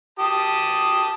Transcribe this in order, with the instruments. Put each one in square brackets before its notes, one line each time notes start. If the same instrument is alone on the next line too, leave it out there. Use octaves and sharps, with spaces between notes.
[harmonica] G4 A5 D#6